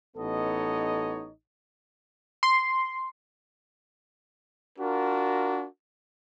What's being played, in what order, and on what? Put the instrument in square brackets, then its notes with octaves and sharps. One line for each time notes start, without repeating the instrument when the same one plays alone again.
[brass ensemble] A1 B3 D#4 A4 C#5 D#5
[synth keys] C6
[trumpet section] D4 F4 F#4 A#4